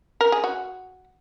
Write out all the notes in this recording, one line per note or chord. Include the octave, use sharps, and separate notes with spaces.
A#4
G#4
F#4